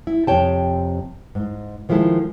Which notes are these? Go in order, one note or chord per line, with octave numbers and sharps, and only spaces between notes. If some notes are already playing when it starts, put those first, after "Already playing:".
E4
F2 C3 C#5 G5 A5
G#2
D#3 F3 G#3 E4 A4